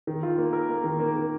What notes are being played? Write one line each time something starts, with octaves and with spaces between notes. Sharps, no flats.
D#3
F4
A#3
A#4
A#3
D#3
A#3
A#3